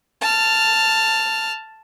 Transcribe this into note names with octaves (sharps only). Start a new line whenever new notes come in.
A5 F6